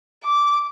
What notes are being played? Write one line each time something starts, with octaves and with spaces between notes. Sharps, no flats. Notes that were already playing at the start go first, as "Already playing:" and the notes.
D6